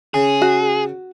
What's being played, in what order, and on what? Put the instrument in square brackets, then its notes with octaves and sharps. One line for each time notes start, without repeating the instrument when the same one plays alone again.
[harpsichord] C#3 [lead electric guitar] G#4
[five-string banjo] F#4